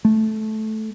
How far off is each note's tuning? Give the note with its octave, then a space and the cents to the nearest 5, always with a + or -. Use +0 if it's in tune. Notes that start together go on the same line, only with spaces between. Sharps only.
A3 -15